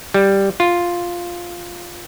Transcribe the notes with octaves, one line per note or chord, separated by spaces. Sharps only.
G3
F4